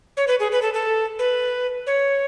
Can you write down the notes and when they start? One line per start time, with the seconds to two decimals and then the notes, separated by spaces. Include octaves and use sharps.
0.17 C#5
0.27 B4
0.40 G#4
0.52 B4
0.62 A4
0.74 A4
1.19 B4
1.87 C#5